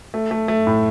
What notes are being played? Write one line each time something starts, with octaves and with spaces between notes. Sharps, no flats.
A3
A3
A3
A2